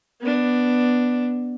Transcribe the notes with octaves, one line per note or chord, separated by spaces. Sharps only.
B3 D4